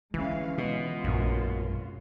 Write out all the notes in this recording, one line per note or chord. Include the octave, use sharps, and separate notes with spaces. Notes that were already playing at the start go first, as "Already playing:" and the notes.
D3 E3 G#3 C#4 F5
B2 G#3 F4
A#1 F#2